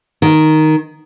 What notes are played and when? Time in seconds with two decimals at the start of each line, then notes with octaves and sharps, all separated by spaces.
0.22 D#3